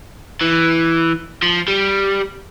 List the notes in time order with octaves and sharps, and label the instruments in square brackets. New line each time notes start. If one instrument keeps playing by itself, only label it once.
[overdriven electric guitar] E3
F3
G3